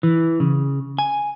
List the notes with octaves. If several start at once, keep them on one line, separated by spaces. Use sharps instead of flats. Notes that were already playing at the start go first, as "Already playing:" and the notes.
E3
C#3
G#5